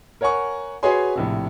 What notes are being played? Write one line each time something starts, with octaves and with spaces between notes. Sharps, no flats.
A#4 C#5 F#5 G#5 C#6
F#4 G#4 B4 C#5 G#5 C6
A#1 A2 C3